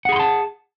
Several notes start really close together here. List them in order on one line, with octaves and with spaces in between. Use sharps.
F#5 G#4 B5 C6 A5